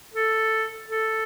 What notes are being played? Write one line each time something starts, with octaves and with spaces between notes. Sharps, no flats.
A4
A4